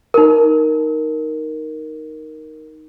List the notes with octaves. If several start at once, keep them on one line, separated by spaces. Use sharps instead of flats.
D#4 A#4